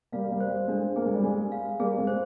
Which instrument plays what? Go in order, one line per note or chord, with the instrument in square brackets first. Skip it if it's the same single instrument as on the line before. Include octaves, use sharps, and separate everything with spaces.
[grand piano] G3 A#3 [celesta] F5
[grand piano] G3 A#3
[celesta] C5
[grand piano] G3
[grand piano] G#3 [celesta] D4
[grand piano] A#3 [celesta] G#4
[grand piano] G#3
G3
[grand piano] G#3 [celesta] G#5
[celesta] F5
[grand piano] G3 A#3 [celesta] G#4
[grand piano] G#3 C4
[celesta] C5